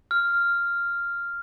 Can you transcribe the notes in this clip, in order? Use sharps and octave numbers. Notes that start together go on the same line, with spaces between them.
F6